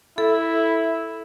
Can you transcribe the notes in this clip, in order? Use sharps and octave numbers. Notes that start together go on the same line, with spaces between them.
E4 A4